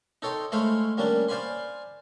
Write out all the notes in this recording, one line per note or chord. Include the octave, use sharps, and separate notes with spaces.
D#4 A4 C#5 G5 C6
G#3 A3 C5 C#5 F5 B5
G3 A#3 C#4 D4 D5
C5 D5 F5 G#5 B5 C6